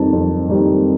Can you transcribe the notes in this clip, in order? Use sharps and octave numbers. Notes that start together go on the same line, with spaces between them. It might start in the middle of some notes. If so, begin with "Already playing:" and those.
Already playing: F2 D#3 G3 C4 A5
F2
D#3 G3 C4